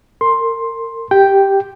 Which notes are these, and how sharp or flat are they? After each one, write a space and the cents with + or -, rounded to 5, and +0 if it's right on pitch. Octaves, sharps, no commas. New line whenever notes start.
A#4 -30 C6 +10
G4 +0 G5 +0